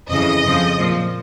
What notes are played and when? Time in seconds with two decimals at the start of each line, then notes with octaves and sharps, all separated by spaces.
0.09 F2 C#3 E3 D#5
0.43 F2 C#3 F3
0.77 A#2 F3